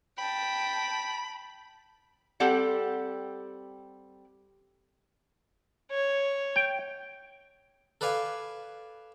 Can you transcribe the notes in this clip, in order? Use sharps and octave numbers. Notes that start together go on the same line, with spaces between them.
G5 A5 B5
G3 C4 G4 A4 F#5
C#5
G5
A4 B4 D5 F5 G#5